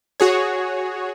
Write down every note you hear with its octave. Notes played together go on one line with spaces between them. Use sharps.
F#4 G#4 C#5